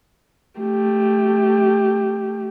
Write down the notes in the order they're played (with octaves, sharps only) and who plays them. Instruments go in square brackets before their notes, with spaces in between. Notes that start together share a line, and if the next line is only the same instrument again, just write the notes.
[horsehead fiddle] A3 G4